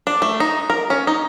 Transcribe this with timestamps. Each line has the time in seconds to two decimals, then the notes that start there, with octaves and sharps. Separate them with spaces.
0.07 D4
0.22 A3
0.40 D#4
0.70 A#4
0.90 C#4
1.07 D#4